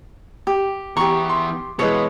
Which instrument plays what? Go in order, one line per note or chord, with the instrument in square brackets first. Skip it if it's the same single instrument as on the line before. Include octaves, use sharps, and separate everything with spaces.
[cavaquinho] G4
[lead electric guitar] E3 B3 [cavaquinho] G4 C#6 [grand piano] A#5
[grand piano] C6
[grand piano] B2 E3 G#3 [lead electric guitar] B3 [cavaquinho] C#5